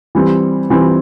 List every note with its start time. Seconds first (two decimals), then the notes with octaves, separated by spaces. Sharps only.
0.15 E3 G3 C4
0.70 E3 G3 C4